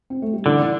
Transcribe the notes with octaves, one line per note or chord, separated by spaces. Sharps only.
C4
A3
G3
D3 E3